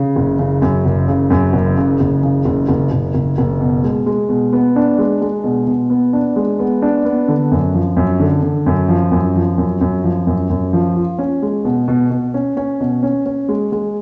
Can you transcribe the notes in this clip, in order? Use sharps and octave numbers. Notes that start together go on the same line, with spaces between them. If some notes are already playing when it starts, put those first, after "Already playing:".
Already playing: C#3
F#1
C#3
F#2
F#1
C#3
F#2
F#1
C#3
F#1
C#3
F#1
F#1
F#1
F#1
F#1
B2
G#3
G#3
B2
B3
D4
G#3
G#3
B2
B2
B3
D4
G#3
B3
D4
B3
D3
F#2
F3
F#2
D3
D3
F#2
F3
F#2
F3
F#2
F#2
F3
F#2
F#2
F3
F4
C#4
G#3
B2
B2
B2
C#4
C#4
B2
C#4
C#4
G#3
G#3